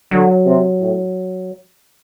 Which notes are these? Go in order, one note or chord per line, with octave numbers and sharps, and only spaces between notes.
D3 F#3
C3
A2